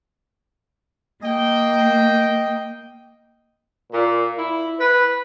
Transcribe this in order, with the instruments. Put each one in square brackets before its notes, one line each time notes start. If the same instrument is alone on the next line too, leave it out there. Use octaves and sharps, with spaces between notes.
[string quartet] A#3 [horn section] D#5 G5
[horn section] A#2
E4
B4